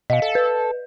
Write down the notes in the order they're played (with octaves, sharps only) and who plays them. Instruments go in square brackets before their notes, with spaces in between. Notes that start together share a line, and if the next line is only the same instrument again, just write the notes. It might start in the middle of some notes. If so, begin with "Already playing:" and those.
[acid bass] B2 [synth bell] D#5 F5
[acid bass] A4
[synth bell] B4